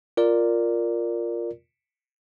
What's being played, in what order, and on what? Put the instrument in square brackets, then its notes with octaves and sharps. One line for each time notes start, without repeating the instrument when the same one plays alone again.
[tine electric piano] F4 A#4 D5